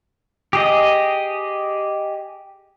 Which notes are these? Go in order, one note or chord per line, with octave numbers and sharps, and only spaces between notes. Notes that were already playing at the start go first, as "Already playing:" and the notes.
G4 G#4 D#5